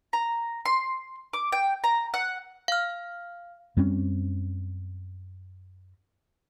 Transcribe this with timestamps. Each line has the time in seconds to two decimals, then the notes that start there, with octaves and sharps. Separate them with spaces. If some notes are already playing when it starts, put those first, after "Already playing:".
0.13 A#5
0.66 C6
1.33 D6
1.52 G5
1.84 A#5
2.14 F#5
2.68 F5 F6
3.77 F#2 G3 C4 C#4